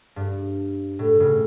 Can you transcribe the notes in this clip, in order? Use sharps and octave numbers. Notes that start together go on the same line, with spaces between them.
G2
A2
A2 C#3